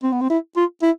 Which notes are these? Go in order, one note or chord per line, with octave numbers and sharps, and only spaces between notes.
C4
B3
C4
E4
F4
E4